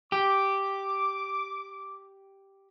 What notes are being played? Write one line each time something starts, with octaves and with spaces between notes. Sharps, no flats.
G4 D6